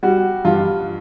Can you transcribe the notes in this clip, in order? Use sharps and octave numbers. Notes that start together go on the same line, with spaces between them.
G3 F#4
G2 F4